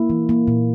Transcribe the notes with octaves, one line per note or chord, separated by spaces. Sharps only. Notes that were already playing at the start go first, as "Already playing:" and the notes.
Already playing: A#3 E4
E3
A#3
A#2